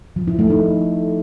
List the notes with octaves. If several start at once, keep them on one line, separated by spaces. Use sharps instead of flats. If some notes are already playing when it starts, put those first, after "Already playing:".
F3
E4
A3
D#4